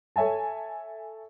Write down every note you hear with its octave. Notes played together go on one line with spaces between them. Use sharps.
A4 C#5 E5 G#5 A5